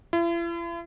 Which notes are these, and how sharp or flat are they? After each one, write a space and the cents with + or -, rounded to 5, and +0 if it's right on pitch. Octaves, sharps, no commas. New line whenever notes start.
E4 +45